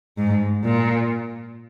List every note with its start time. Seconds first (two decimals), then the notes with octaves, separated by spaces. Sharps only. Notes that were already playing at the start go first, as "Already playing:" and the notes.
0.18 G#2
0.64 A#2